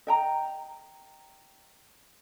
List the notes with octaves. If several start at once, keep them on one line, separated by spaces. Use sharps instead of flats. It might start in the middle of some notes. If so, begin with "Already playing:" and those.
D#5 G5 A#5